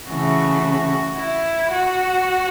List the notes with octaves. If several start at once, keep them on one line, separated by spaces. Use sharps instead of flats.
C#3 E3 A3 F#4
E4
F#4